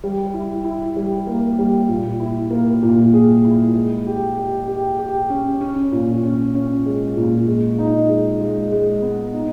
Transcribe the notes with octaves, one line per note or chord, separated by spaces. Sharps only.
G3
E4
E4
G3
A#3
G3
A#2
E4
A#3
A#2
G#4
E4
G#3
G4
G4
G4
G4
C#4
C#4
A#2
C#4
C#4
G#3
A#2
G#3
D#4
G#3
G#3
G#3
B3
D#4